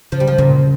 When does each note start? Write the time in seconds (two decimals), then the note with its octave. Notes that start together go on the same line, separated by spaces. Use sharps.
0.12 C#3 F3
0.20 G3
0.27 F3
0.38 A#2 C#3